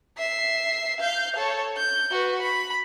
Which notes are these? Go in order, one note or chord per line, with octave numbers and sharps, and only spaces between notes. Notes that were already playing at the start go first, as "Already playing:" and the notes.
E5 C7
F5 G6
A4 C#5
G6
F#4 B4
B5